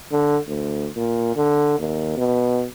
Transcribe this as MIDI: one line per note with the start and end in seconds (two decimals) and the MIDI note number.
0.12 0.38 50
0.47 0.89 38
0.96 1.31 46
1.36 1.79 50
1.79 2.13 39
2.17 2.65 47